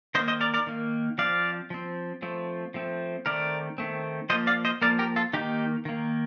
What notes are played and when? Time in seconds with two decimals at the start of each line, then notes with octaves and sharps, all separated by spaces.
0.15 D#3 C5 D#5
0.18 A#3
0.28 C5 D#5
0.41 A#4 D5
0.54 A#4 D5
0.67 D#3 A#3
1.18 F3 C4 D5 F5
1.70 F3 C4
2.22 F3 A3 C4
2.74 F3 A3 C4
3.26 D#3 A3 C4 A#4 D5
3.78 D#3 A3 C4
4.30 F3 A#3 C5 D#5
4.47 D5 F5
4.65 C5 D#5
4.82 F3 A#3 A#4 D5
4.99 G4 A#4
5.16 F4 A4
5.33 D#3 A#3 D#4 G4
5.85 D#3 A#3